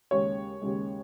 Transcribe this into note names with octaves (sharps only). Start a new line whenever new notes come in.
D#2 C#3 G#3 C#5
D#2 C#3 G#3